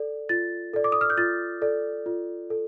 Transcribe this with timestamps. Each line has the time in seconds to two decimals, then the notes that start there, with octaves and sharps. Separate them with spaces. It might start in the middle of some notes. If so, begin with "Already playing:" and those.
Already playing: A4 D5
0.29 F4 A6
0.74 A4 D5
0.84 D6
0.92 D#6
1.01 F6
1.10 G6
1.17 F4 A6
1.62 A4 D5
2.06 F4
2.50 A4